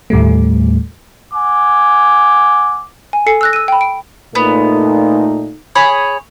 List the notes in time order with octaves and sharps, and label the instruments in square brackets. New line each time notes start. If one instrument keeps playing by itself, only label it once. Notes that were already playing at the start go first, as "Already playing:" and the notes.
[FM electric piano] D#2 A2 G3 A3
[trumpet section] F#5 G#5 D6
[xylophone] G#5
A4 G#5 C7 C#7
E6 F#6 A#6
E6 D#7
G5 B5
D7
[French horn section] A#2 A3 D#4 [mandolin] B3
[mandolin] G#4 C#5 B5